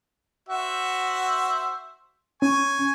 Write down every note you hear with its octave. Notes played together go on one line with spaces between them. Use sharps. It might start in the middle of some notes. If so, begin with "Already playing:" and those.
F#4 C5 E5
C#4 G#5 C#6